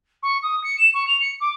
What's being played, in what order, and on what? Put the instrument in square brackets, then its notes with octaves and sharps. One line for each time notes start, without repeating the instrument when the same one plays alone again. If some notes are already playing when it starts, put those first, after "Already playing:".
[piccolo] C#6
D#6
C#7
E7
C#6
F7
C#7
D6